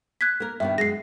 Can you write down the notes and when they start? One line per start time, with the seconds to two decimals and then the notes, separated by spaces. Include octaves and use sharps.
0.21 F#6 G#6 B6
0.40 A#3 A#4
0.60 G2 B2 D#3 E5
0.78 F#2 G#3 A#6 C7